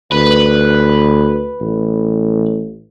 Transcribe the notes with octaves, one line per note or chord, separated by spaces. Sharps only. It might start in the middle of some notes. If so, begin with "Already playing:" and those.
D2 B4
A1